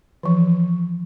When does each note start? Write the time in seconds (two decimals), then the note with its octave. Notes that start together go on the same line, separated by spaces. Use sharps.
0.23 E3 F3